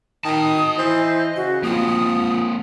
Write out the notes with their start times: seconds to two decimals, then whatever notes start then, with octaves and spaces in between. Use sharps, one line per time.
0.25 D#3 D#5 A5 D#6
0.78 E3 C5
1.36 C#3 F#4
1.63 F3 A#3 C4 D#6